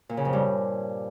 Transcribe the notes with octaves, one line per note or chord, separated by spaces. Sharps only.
A#2
C#3
F2
G2